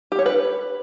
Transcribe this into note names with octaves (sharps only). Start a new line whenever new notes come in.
G4
C#5
B4